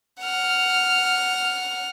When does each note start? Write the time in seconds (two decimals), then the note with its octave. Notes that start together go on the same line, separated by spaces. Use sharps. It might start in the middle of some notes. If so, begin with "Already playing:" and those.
0.21 F#5 F6